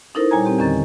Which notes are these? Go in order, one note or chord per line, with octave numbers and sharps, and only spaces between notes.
C#4 D#4 E4 A4 A#4 C5
A#2 G3 C#5 G#5 A#5 G#6
C4 G4
E2 D3 D#3 C#4 A#5 A6